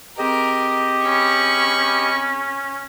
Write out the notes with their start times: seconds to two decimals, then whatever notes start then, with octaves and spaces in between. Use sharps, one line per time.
0.18 C4 G4 G#4 A#4 D#5
1.06 C#4 B5 C#6